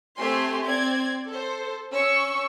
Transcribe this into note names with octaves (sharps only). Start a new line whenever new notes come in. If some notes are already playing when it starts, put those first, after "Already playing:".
A3 C4 G4 G#5 C6
C4 D5 G#6
A4 C5
C#4 C#6 E6